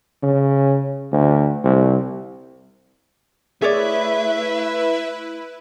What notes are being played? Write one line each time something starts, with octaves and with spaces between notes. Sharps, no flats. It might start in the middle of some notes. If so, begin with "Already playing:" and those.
C#3
D2
C2
A3 E4 G#4 B4 C#5 D5 E5